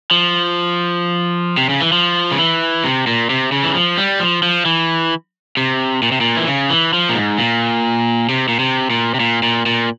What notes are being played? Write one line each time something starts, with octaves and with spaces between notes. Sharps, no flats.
F3
C3
C#3
E3
F3
C#3
E3
C3
A#2
C3
C#3
E3
F3
G3
F3
F3
E3
C3
A#2
C3
A#2
E3
C#3
E3
F3
A#2
G#2
A#2
C3
A#2
C3
A#2
C3
A#2
A#2
A#2